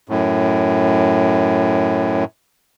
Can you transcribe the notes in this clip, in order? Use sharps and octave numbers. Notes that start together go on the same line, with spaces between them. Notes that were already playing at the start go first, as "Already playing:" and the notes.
F#2 A2